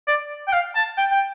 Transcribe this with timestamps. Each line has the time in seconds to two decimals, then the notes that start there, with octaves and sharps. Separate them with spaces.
0.08 D5
0.48 G5
0.53 F5
0.75 A5
0.98 G5
1.11 G5